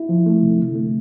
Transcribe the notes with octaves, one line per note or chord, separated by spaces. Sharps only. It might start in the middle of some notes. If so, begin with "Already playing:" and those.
Already playing: E4
F3
A3
C3
D3
A3